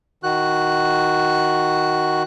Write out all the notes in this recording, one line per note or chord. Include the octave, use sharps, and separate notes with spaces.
D#3 F#4 F#6